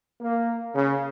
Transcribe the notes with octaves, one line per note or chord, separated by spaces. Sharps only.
A#3
C#3